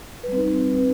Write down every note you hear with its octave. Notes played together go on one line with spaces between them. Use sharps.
G3 C4 D#4 B4